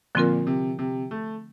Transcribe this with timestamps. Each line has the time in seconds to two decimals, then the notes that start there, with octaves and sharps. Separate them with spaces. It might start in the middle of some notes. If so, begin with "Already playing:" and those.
0.15 A#2 D3 F3 C4 F4 A#4
0.47 C3
0.79 C3
1.11 A3